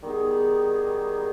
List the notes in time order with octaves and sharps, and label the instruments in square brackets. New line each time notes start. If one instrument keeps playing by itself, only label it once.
[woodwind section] D#3 G3 B3 D#4 G#4